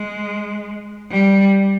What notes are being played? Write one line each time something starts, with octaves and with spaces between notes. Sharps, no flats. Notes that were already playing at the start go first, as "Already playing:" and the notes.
Already playing: G#3
G3